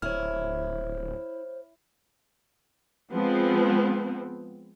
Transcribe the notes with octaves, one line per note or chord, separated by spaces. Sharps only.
D1 E4 C5 C#5 F6
F3 G#3 B3 C4